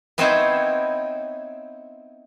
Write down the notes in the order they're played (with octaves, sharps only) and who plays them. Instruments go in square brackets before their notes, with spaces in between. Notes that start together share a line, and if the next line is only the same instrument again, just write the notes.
[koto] B3 C4 D#4 E4 C5 C#5